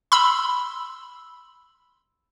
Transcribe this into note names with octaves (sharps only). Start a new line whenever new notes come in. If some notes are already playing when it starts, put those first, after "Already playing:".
B5 C6 E6